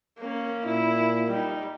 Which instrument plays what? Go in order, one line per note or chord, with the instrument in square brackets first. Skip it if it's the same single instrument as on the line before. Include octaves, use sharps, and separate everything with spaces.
[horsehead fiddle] A#3 C#4
[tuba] A#2 [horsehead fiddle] E4
[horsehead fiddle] G3 D#4